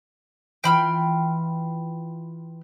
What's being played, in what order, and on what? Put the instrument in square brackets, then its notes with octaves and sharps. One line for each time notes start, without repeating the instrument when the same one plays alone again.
[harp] E3 F4 [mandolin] G5 B5 F6